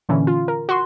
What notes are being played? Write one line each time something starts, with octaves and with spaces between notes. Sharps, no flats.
A#2 D3 E3 C#4
F4
A#4
F#4 C6 C#6